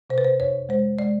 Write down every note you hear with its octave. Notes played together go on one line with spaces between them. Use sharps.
C3 C5
B4
C5
F2 C#5
G#3 C5
G#3 D5